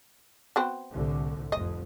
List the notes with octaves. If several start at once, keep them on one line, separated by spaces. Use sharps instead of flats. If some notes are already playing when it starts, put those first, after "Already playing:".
B3 C4 F#4
C2 A2 D3
F1 F2 D#5